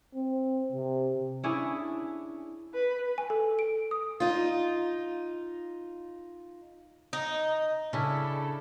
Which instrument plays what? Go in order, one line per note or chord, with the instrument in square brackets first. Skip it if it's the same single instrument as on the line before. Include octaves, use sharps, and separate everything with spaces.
[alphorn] C4
C3
[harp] C#4 D4 E4 G#4
[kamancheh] B4
[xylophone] G#5
A4
D7
D#6
[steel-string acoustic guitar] D#4 F4
[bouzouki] D#4
[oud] C#3 [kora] C#4 E4 [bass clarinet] D4 [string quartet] A4 D5